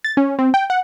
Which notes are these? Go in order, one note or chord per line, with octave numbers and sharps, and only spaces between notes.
A6
C#4
C4
G5
F#5